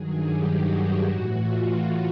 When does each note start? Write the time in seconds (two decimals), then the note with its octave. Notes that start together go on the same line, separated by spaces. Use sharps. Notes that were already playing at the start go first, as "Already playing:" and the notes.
Already playing: G2 D#3 F#3 G#4
0.21 G4
0.49 F#4
1.07 A2 E3 F#4
1.35 F4